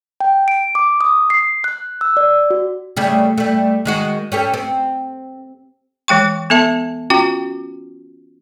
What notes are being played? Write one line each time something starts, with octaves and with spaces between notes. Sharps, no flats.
G5
D7
D6
D#6
C7
F#6
E6
D5
F#4
C#3 G3 A3
G3 A3
D#3 G#3 F#4
C#4 G4 A4
C4
E3 G#3 G5 C#6
B3 A4 E5 A5
C#4 F4 F#4 G5